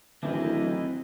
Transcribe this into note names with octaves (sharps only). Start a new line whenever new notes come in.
D1 D#3 E3 F#3 C4 E4 D#5